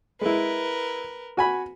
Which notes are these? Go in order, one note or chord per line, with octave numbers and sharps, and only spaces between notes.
G#3 E4 A#4 B4
F#4 G#5 B5